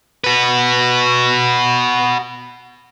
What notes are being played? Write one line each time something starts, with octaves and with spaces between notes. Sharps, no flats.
F#4 B4